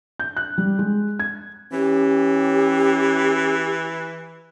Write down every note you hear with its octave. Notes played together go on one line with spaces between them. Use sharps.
G6
F#6
G3
G#3
G#6
E3 C#4 G4